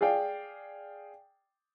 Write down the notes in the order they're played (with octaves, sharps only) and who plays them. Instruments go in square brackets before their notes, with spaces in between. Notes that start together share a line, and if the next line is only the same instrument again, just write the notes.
[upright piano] G#4 D5 F5 G5